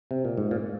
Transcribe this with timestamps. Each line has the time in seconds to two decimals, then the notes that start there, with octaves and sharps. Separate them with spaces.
0.11 C3
0.25 A#2
0.37 G#2
0.51 A#2